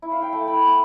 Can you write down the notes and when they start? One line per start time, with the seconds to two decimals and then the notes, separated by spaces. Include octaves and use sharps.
0.02 E4
0.12 F5
0.17 E4
0.22 G5
0.33 A3 A5
0.47 E4 B5
0.62 B3 B5